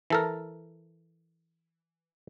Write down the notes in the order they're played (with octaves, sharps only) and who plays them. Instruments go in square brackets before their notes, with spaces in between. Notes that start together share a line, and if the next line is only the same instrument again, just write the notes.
[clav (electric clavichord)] E3 A4 A#4